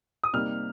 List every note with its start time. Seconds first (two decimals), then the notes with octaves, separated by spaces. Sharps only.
0.24 D#6
0.33 C3 G3 A#3 D#4 F6